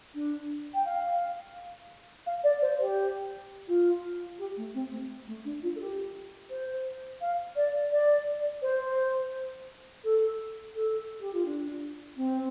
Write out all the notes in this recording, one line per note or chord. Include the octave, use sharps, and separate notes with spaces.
D4
G5
F5
F5
D5
C5
G4
F4
G4
A3
C4
A3
A3
D4
F4
A4
G4
C5
F5
D5
D5
C5
A4
A4
G4
F4
D4
C4